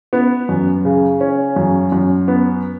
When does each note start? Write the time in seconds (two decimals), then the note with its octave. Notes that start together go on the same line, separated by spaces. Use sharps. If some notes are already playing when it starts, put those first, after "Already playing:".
0.13 B3
0.49 F#2
0.85 C#3
1.21 C#4
1.56 F#2
1.92 F#2
2.28 B3